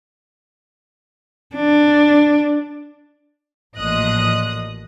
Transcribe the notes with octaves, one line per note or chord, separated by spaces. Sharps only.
D4
A1 A#2 F3 D#5 D#6 F#6